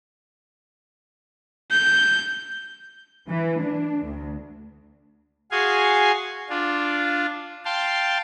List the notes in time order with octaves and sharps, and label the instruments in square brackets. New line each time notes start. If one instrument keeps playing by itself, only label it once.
[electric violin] G6
[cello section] E3
D4
D2
[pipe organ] F#4 G#4 F5 G#5 C6
D4 F4
F5 G5 A5 C6